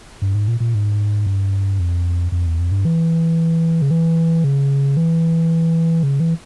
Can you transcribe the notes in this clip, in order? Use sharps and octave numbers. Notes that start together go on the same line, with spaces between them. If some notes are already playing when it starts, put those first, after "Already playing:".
G2
G#2
A#2
A#2
G#2
G2
F2
F2
E2
F2
G2
E3
C#3
E3
C#3
E3
C#3
E3